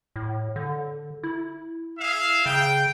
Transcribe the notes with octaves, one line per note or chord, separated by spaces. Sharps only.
A2
D3
E4
G#4 E5 F5
C#3 G5